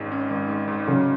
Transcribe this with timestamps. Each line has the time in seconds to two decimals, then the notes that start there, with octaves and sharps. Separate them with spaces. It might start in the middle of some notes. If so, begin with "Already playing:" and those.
Already playing: G#1 G#2 G#3 C#4
0.12 C#4
0.30 G#1
0.49 G#3
0.68 G#2
0.87 C#3 F#3 C#4